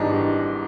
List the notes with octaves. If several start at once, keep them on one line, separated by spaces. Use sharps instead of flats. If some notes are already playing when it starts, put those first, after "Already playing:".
Already playing: G#1 G#2 E3 G3 D4 D#4